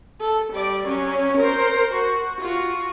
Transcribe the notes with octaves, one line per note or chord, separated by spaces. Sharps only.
A4
G3 D5
F#3 C#4
A#4 C5
F#4
F4 F#4